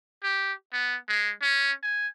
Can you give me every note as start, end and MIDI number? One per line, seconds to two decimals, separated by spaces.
0.23 0.53 67
0.73 0.96 59
1.08 1.32 56
1.42 1.72 61
1.83 2.08 80